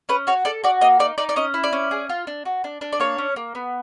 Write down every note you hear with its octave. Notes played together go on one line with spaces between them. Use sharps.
C#4 B4
F#4 C#5
A4 D5
F#4 D5
A#3 D#5
D#4 D5
D#4 D5
D5
C#4 D#5
E4
D5
C#4
G#4
F4
D4
F#4
D4
D4
D5
A#3 C#5
C#4
A#3
B3